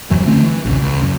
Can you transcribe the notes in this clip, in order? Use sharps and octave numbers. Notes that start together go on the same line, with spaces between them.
D#1 F#2 E3 F#3
D3 A3 C4 C#4
E3
A#1 D#2 C#3
C#2
F#2 C#3